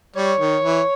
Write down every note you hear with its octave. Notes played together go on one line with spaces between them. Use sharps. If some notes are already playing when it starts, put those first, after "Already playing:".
G3 C#5
D#3
E3